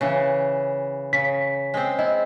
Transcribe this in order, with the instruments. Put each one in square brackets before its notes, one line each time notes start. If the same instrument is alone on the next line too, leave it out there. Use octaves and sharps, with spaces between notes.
[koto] C#3 E3
[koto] C#3 [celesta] B6
[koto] G#3 C4
[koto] E4 [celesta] D#5